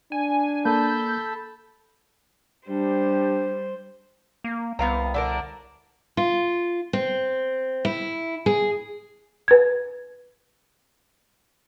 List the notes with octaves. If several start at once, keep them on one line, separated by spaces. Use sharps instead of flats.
D4 G#5
A#3 A4 A5 B5 G6
G3 D4 G4 C5
A#3
C2 B3 F5 A#5
D3 D4 A#4
F4
C4
E4
G#4
B4 G#6